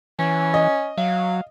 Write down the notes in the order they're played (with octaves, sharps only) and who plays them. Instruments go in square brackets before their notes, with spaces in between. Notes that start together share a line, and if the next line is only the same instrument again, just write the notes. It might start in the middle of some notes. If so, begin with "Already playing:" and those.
[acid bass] E3 [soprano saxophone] C#4
[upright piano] D#5
[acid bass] F#3 [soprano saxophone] F5